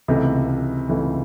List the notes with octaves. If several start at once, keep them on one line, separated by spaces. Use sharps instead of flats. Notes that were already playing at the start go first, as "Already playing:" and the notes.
C#2 C3 E3 A3
C#2 C3 E3 A3